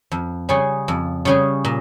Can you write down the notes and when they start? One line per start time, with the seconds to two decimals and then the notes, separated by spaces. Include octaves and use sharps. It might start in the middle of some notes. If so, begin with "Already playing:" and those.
0.11 F2
0.49 C#3 G3 C#4 G#4
0.88 F2
1.25 C#3 G3 C#4 G#4
1.65 A#2